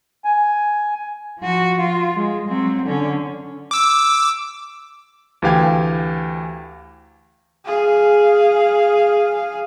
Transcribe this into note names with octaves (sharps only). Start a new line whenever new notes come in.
G#5
F3 F#4
F4
G#3
F#3 C4
D3 C#4
D6 E6
D2 E3 G4 F5 G5 G#6
G#4 F5